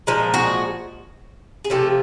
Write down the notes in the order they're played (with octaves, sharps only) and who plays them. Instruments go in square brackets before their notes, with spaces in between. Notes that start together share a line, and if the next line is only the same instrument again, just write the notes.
[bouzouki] A#2 F3 G#3 A#4
F#4 G#4
G#4
C3 F3 A3 G4 A4